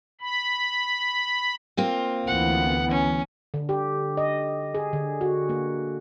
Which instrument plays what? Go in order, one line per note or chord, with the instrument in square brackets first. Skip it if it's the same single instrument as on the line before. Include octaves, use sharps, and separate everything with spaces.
[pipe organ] B5
[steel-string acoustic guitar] A#3 C4 F4
[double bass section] D2 E3 B3 [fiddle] F#5
[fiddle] C#4
[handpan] D3
G4
D#5
G#4
D3
F#4
A#3